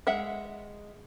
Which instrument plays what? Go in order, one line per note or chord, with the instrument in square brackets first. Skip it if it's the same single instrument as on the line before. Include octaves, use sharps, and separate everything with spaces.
[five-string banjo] G#3 E5 F#5